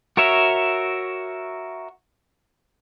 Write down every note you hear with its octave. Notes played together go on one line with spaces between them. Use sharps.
F#4 A#4 C#5 E5